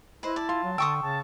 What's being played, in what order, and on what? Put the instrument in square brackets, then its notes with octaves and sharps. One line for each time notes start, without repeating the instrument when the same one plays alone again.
[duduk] E4 [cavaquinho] B4 C5 [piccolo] D#5
[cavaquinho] D5 [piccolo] A5
[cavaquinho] F4 [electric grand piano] C6
[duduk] F#3
[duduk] D3 [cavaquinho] G5 C6 D#6 [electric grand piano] C#6 E6
[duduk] C#3 [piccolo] A5